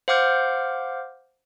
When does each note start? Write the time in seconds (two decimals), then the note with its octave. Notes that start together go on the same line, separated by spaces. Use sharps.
0.08 C5 F5 F#5 D6 F6 G6